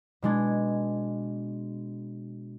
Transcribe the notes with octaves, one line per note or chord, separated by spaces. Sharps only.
B2 G#3 D4 G#6